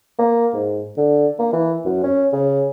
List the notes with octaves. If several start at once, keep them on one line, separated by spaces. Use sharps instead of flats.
A#3
G#2
D3
A#3
E3
F#2
C#4
C#3